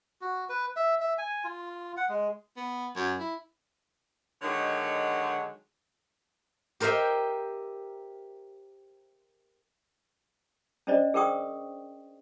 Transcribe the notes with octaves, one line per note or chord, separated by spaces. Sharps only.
F#4
B4
E5
E5
G#5
F4
F#5
G#3
B3
F#2
E4
D3 D#3 F#3 G#3 C#5
G4 A#4 C5 D#5 E5 G5
C#4 D4 C5 D5 D#5
G#4 A#4 B4 G5 C#6 D#6